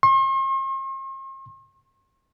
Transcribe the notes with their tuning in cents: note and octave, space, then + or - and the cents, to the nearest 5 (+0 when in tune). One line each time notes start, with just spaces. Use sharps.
C6 +45